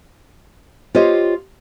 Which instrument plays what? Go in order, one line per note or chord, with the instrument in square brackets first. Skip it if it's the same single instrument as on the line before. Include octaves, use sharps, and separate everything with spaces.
[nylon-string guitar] F4 G4 C5 C#5 D#5